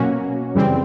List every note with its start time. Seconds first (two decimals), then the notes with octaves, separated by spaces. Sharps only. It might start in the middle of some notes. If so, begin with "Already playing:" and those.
Already playing: B2 F#3 A#3 C#4 F#4
0.55 F#2 C#3 E3 G3 C4